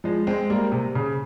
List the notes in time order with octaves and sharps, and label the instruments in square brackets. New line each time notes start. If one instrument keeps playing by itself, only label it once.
[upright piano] F3 G#3
G#3 C4
G3 A#3
C3
C#3